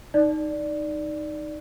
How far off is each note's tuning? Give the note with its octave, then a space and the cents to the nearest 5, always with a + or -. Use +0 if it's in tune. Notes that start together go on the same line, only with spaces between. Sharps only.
D#4 -5 D5 +0